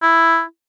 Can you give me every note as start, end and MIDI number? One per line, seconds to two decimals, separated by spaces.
0.02 0.42 64